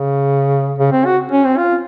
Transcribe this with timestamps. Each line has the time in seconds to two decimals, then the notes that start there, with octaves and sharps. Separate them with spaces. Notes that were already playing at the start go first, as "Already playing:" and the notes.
Already playing: C#3
0.79 C#3
0.92 C4
1.05 F#4
1.32 C#4
1.45 C4
1.58 F4